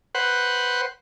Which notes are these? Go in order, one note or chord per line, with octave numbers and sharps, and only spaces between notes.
B4 C5 F#5